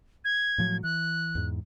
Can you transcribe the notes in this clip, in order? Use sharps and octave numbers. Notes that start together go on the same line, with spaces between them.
G#6
A2 F3 F#3
E3 F#6
E2 G#2